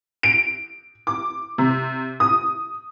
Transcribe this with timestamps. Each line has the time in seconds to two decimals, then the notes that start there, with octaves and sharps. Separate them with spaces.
0.23 D7
1.07 D6
1.58 C3
2.20 D#6